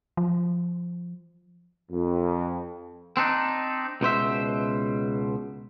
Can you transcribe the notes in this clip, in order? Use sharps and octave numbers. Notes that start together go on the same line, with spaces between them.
F3
F2
C4 D4 D#4
C#2 B2 C5 E5